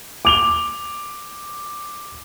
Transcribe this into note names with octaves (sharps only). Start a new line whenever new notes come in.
D6 F7 G7